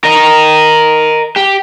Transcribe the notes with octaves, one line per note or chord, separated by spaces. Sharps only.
A#4 D#5
G4